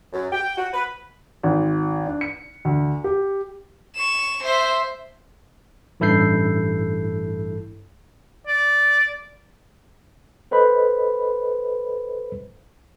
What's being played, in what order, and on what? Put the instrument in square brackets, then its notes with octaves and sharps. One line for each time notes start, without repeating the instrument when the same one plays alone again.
[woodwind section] F#2
G5
F#4
B4
[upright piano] G#1
D4
C#7
D2
G4
[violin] C#6 E7
C5 E5
[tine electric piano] A1 G2 E4 A4 G6 C7
[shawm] D5
[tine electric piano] A4 B4 C5 D#5 B5